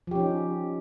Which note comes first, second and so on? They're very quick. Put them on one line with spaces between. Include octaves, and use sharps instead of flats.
F3 G4 C#4 D#4